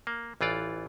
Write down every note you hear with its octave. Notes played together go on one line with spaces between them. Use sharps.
A#3
A1 E3 F4 D5